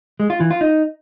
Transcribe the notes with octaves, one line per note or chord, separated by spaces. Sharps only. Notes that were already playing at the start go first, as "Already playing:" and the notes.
G#3
F4
E3
F4
D#4